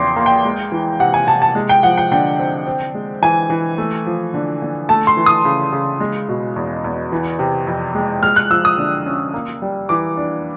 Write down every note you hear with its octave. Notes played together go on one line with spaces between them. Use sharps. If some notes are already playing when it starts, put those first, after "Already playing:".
Already playing: E2 C#3 F3 G5 C6 D6
A#3
G5
G#3
E3
C3 F#5
G#5
C3 A5
A5
G#3
G5
F3 F#5
G5
D3 G5
C4
C4
G#3
E3 G#5
E3
A3
F3
D3
D3
A3 A5
C6
E3
D#6
C#3
C#3
G#3
B2
E2
E2
E3
C3
F2
G#3
G#3 F6
F#6
F3 E6
D#6
D3
C#4
A#3
G3
E3 D6
D4